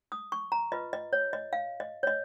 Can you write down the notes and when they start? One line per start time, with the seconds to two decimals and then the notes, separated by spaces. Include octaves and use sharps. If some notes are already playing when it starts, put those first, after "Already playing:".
0.12 D#6
0.32 C#6
0.52 A#5
0.72 F4 B4 D#5
0.93 D#5
1.13 C#5
1.33 D#5
1.53 F5
1.80 D#5
2.03 C#5
2.07 D#5